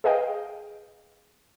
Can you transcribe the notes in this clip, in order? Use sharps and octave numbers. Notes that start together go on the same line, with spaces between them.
G#4 B4 D#5 F5 G5